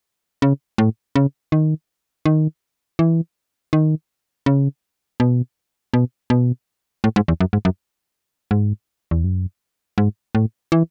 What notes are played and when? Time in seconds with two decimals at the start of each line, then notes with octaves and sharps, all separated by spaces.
0.42 C#3
0.78 A2
1.16 C#3
1.52 D#3
2.26 D#3
2.99 E3
3.73 D#3
4.46 C#3
5.20 B2
5.94 B2
6.30 B2
7.04 A2
7.16 G#2
7.28 E2
7.40 F#2
7.53 G#2
7.65 F#2
8.51 G#2
9.11 E2
9.24 F#2
9.98 G#2
10.35 A2
10.72 E3